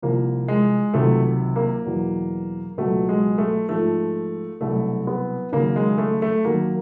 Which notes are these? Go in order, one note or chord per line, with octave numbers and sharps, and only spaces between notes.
C2 C3 F3 A#3
G#3
C#2 C3 D#3 F#3 A3
A#3
E2 B2 F#3
C#2 B2 F#3 A3
G#3
A3
G#2 F3 A3
C2 B2 F#3 A3
B3
D#2 C#3 F#3 A#3
G#3
A3
A3
D#2 D#3 F#3 A#3